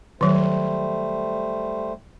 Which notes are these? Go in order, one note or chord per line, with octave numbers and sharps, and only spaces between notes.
D#3 F#3 G3 A3 C5